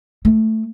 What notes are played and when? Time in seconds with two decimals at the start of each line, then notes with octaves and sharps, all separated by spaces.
0.25 A3